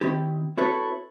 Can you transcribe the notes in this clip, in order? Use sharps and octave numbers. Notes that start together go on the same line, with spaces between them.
D#3 C4 E4 G4
C4 E4 F#4 A4 B4 C#5